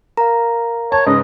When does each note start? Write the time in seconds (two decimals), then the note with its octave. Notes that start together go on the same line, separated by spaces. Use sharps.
0.17 A#4 F5 A#5
0.92 C#5 A5
1.07 G#2 C#3 C#4 B4 D#5